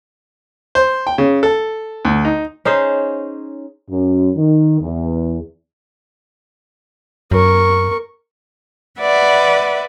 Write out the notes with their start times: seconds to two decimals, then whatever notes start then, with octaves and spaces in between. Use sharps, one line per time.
0.75 C5
1.07 G5
1.18 C#3
1.43 A4
2.05 D2
2.25 D#4
2.65 C#4 D#4 G#4 C5
3.89 F#2
4.36 D#3
4.81 E2
7.31 F#2 A#4 C#6
8.99 B4 D5 E5 F#5